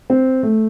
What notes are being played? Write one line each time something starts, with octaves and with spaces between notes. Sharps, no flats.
C4
A3